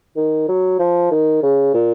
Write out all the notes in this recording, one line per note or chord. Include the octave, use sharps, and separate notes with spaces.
D#3
F#3
F3
D#3
C#3
A#2